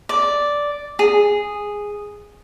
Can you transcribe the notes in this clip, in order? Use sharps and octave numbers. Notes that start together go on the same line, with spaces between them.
D5
G#4